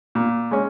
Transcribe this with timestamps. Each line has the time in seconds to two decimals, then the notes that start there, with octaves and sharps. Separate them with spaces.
0.15 A#2
0.51 G#3 C#4